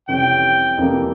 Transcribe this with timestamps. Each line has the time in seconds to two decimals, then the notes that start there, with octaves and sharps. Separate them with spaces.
0.08 F1 F2 E3 G3 C#4 G5
0.78 F2 E3 G3 A#3